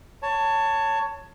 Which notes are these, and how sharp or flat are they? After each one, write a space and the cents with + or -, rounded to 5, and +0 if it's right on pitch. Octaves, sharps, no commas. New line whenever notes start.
C#5 +10 A5 +20